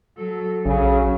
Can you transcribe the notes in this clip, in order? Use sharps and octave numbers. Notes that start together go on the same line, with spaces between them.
F#3 A4
A#1 C#3 F#3 C#4